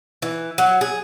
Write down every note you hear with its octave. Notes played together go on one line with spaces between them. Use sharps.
E3
F#3
G#4